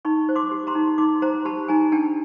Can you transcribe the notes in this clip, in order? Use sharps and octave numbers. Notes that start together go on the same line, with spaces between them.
D#4 B5 C#6
C5
C6 D6
G4
A#5 C6
D#4
D#4 C6 D6
C5 A#5 C6
G4 A5 B5
D#4 G#5 A#5
D4 G5 A5